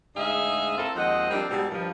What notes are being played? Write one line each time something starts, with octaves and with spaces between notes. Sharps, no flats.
D2 G#2 D#4 G#4 E5 F5
A#3 C4 E4 F4 A4
D#2 F3 G#3 C4 D#5 F#5
F3 G3 A#3 C4 D4 G4
G#2 B2 E3 G3
G2 D#3 F3